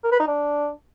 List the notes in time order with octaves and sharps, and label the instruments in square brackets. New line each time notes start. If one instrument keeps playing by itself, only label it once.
[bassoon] A#4
B4
D#4
D4